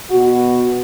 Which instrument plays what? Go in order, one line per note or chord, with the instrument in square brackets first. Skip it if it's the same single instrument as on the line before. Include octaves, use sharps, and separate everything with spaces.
[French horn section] B2 B3 F#4